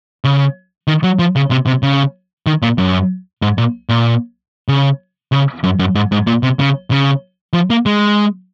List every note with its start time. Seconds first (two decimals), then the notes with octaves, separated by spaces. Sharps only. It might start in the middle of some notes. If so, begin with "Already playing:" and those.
0.24 C#3
0.88 D#3
1.04 F#3
1.19 F3
1.36 C#3
1.51 C3
1.67 C3
1.83 C#3
2.47 D#3
2.62 A#2
2.78 F#2
3.42 G#2
3.58 A#2
3.89 A#2
4.68 C#3
5.32 C#3
5.64 F#2
5.79 F#2
5.95 G#2
6.12 G#2
6.27 A#2
6.43 C3
6.59 C#3
6.91 C#3
7.54 F3
7.70 A#3
7.86 G#3